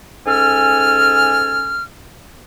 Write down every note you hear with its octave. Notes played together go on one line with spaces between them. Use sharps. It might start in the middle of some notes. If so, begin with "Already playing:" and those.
G#2 C#4 A4 G#5 F6